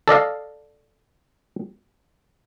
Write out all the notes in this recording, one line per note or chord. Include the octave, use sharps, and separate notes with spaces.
A4 D5 D#5 F5